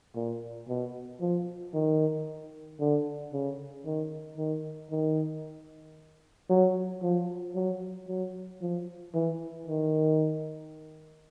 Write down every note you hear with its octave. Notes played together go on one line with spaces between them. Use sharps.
A#2
B2
F3
D#3
D3
C#3
D#3
D#3
D#3
F#3
F3
F#3
F#3
F3
E3
D#3